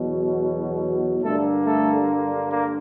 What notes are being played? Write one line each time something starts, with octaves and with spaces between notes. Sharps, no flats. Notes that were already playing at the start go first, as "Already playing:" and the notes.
Already playing: E2 B2 F#3
G2 D3 G3 A3 A#3 A4
A3 A4
A#3